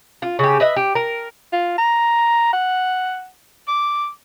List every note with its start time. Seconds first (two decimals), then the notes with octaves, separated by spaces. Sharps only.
0.22 F4
0.39 C#3 G4
0.60 B4 D#5 E5
0.76 G4
0.95 A#4
1.53 F4
1.78 A#5
2.53 F#5
3.68 D6